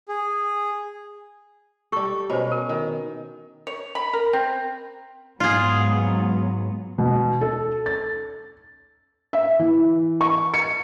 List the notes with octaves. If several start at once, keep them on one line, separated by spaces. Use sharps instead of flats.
G#4
G3 G4 A4 C#6
B2 C#4 C5 B5
A#4
D#3
C#5
B5
A#4
C4
G#2 F#3 B3 F4 G#4
B2
A4
A6
E5
E3
C#6
C#7